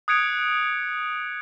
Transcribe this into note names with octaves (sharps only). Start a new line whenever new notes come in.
D#6 F#6 G#6 C#7 D7 F7